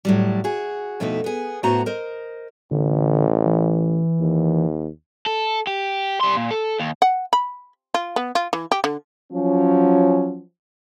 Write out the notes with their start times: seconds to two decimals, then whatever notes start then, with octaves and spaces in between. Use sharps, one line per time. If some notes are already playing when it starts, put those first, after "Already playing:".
0.05 A2 F#3 G3
0.44 F#4 G#4
1.00 F2 B2 A3 D#4 E4
1.24 B3 G#4
1.63 A2 A3 B3 F#4 C5 A#5
1.86 A#4 C5 D#5
2.71 A1 D3
3.46 E3
4.20 D#2
5.26 A4
5.67 G4
6.21 G3 C6
6.37 A#2
6.51 A4
6.80 D#2
7.02 F#5
7.33 B5
7.94 F4
8.16 B3
8.35 F4
8.53 E3
8.72 G4
8.84 D3
9.32 F3 F#3 C#4